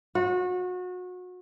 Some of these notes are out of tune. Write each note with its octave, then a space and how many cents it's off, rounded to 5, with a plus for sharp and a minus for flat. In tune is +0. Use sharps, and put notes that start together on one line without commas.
F#4 -30